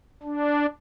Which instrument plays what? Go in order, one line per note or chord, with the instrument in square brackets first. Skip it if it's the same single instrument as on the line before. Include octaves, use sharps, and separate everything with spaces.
[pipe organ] D4